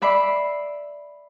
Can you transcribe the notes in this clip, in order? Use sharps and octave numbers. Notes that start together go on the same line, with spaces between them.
D5 E5 B5 D6 C7